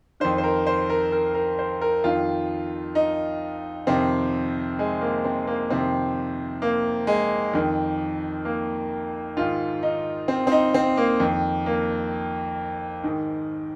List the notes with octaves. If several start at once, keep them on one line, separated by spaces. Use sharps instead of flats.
F2 D#3 C5
C5
A#4
C5
A#4
A#4
A#4
C5
A#4
F2 D#3 F4
D#4
F2 C3 D#3 C4
G#3
A#3
C4
A#3
F2 C3 D#3 C4
A#3
G#3
F2 D#3
A#3
G#2 D#3 F4
D#4
C4
C4
D#4
C4
A#3
F2 D#3
A#3
G#2 D#3